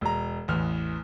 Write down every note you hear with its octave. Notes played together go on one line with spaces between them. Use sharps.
E1 A#5
A1 E2 F6